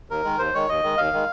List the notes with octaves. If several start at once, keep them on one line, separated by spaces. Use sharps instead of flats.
D#2 A#4
D#3 G#3
D#2 C5
D#3 G#3 C#5
D#2 D#5
D#3 G#3
D#2 F5
D#3 G#3